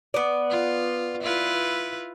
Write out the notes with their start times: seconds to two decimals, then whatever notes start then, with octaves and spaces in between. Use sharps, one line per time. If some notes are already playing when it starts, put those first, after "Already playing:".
0.14 B3 D5
0.50 F4
1.21 E4 F4 B4